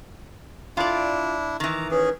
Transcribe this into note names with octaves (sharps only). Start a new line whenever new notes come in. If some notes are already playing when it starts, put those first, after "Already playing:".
D4 E4 F4 D5
D#3 E3 A#5
C#4 G#4 B4